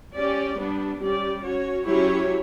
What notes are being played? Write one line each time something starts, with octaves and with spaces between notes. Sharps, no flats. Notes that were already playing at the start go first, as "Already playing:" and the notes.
C#4 G4 D5
G3 B3 D4
G3 C#4 G4 D5
C#4 F#4 C#5
F#3 C#4 E4 G4 C#5